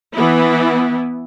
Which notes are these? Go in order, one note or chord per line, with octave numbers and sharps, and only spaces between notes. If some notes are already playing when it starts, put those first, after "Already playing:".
E3 B3 E4